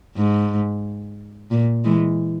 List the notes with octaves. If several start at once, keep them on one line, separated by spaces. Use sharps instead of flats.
G#2
A#2
E3 G#3